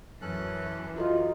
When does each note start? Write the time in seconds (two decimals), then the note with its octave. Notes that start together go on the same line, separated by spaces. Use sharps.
0.22 F#2 E3 C#4 A4 F#6
0.96 D#4 F4 F#4 A4 D#5